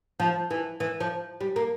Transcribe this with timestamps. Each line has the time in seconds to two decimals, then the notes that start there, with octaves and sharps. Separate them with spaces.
0.20 F3
0.51 E3
0.80 E3
1.00 F3
1.40 G3
1.56 A#3